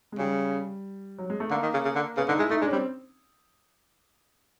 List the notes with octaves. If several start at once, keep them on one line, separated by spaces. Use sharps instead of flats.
G#3
C#3 G3
F#3
G#3
A3
D3 A#3
D#3
C#3
C#3
D3
C#3 B3
D3 D#4
G#3 E4
A3 D#4
G#3 D4
C#4
G3 C4